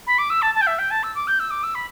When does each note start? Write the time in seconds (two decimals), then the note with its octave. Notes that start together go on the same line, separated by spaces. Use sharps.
0.07 B5
0.18 D6
0.30 E6
0.42 A5
0.54 A5
0.61 G5
0.66 E5
0.78 G5
0.90 A5
1.03 E6
1.15 D6
1.27 G6
1.39 E6
1.50 D6
1.63 E6
1.75 B5